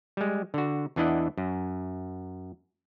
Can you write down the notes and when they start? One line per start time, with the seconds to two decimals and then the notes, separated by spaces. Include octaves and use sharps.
0.17 G3 G#3
0.54 D3 F#4
0.96 E2 E3 D4 E4 D#5 F#5
1.38 F#2